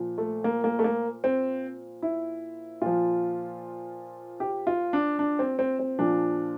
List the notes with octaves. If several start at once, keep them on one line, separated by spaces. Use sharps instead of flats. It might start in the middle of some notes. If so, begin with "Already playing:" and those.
Already playing: A#2 F3
A3
A#3
A#3
A3
A#3
C4
E4
A#2 F3 F4
G4
F4
D4
D4
C4
C4
C4
A#2 F3 D4